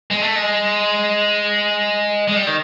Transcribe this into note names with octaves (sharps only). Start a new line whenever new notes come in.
G#3
A3
G#3
G#3
G3
D#3